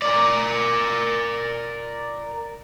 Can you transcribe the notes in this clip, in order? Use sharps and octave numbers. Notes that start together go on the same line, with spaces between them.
A#4 D5